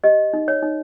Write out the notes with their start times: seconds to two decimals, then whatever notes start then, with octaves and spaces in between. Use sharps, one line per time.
0.04 G4 D#5
0.33 D#4
0.48 C#5
0.63 D#4